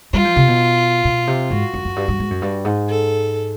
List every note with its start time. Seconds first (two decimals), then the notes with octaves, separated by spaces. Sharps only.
0.13 G3 F4
0.24 F3
0.36 C3
0.48 B2
1.05 B2
1.27 C3
1.50 G#2 F#4
1.74 F#2
1.85 F#2
1.96 G2
2.08 G2
2.19 G#2
2.30 F#2
2.42 G2
2.65 G#2
2.88 A4